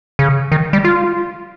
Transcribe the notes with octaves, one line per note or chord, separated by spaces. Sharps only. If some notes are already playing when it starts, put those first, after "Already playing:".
C#3
D#3
G3
F4